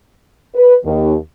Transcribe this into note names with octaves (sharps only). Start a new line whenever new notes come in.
B4
D#2